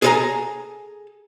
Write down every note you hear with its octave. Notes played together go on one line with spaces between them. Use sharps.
G#4 A4 B4 E5 G#5 A#5